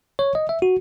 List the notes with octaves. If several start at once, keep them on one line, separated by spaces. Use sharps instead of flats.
C#5
D#5
E5
F#4